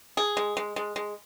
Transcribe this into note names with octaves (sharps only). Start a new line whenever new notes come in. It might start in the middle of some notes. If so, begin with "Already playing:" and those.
G#4
G#3
G#3
G#3
G#3